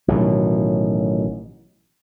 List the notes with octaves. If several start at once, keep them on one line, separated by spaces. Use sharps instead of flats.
A1 B2 D#3 F#3